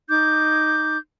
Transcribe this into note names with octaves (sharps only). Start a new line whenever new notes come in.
D#4 D6 G6